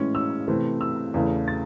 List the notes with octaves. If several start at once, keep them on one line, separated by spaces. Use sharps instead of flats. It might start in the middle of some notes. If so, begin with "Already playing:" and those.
Already playing: A2 E3 G#3 C#4
E6
C3 E3 A3 C4
E6
E2 C#3 E3 A3
A6